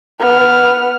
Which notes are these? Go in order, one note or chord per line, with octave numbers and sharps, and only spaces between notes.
B3 F6